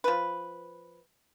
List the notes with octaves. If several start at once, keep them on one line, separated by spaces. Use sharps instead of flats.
F3 B4